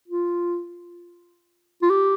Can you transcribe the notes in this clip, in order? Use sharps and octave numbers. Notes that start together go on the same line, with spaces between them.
F4
F4
G4